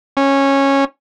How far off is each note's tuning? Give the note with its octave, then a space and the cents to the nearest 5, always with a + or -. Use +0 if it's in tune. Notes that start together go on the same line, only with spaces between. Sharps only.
C#4 -15